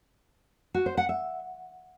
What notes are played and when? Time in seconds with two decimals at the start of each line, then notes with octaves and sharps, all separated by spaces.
0.74 F#4
0.86 C5
0.97 F#5
1.09 E5